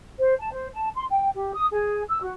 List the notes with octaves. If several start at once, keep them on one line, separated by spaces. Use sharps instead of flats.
C5
A5
C5
A5
C6
G5
G4
D#6
G#4
E6
F#4